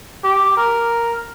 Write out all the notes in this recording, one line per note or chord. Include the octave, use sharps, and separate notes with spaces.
G4
A#4